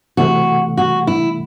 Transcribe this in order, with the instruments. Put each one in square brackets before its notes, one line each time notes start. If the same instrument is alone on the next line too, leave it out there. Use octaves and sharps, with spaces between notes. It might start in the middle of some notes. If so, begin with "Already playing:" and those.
[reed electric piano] C3 E3 A3 [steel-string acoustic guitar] F#4
[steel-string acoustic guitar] F#4
E4